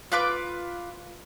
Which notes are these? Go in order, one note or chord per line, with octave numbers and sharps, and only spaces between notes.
F4 B4 D6